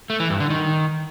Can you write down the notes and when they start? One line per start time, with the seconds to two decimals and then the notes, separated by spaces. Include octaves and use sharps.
0.10 A3
0.20 E3
0.30 G2
0.40 D3
0.50 D#3